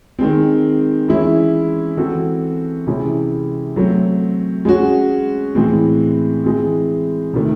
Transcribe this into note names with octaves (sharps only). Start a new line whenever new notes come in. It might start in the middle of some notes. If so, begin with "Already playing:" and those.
D#3 G#3 C4
E3 G#3 C#4 E4
E3 C4 F#4 A4
C3 E3 G#3 C#4 E4
F#3 A3 C4
G#3 C#4 F#4
A2 E3 G#3 C4
E3 G#3 C4
C3 D#3 A3